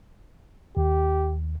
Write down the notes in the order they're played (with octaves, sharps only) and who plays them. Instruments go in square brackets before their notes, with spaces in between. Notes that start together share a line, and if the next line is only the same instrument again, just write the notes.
[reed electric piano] D#2 [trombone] G4